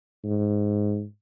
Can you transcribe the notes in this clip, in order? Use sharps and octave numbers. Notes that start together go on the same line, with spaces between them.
G#2